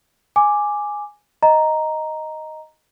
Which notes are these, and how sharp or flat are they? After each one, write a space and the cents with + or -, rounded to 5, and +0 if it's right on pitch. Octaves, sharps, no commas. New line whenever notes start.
G#5 +0 D6 +0
D#5 +0 A#5 +0